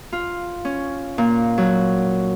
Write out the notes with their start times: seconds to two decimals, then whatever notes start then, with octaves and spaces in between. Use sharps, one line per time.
0.13 F4
0.65 C#4
1.18 A#2
1.58 F#3